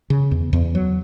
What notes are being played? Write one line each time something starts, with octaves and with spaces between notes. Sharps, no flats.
C#3
E2
E2
F#3